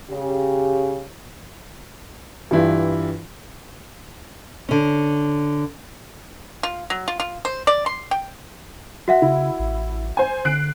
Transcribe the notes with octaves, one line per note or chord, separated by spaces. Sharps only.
C#3 G4
G2 E3 E4 F4 G4
D3 C#4
F4
F#3
F4
F4
C5
D5
C6
G5
F#4 E5 F#5
C#3 E4
A1
C5 G#5
D3 F#6 C7 D7